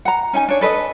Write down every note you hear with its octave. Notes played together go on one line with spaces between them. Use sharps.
F#5 A#5
C#4 D#4 G#5
D4 C#5
A4 B4 C#5 D#5